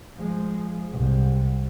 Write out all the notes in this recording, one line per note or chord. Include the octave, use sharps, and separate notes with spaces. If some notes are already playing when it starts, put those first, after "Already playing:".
F3 G#3
C2